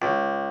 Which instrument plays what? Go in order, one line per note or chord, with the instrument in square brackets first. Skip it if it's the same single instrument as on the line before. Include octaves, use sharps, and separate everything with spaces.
[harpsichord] C#2